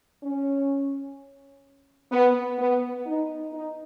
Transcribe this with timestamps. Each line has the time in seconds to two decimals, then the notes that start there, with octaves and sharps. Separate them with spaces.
0.24 C#4
2.12 B3
2.59 B3
3.06 D#4
3.53 D#4